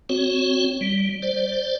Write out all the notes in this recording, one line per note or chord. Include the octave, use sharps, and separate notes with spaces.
C4 F#4 C#5
G3
C5 D5